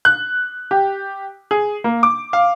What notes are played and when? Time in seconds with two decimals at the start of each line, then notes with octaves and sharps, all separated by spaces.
0.05 F#6
0.71 G4
1.51 G#4
1.84 A#3
2.03 D6
2.33 F5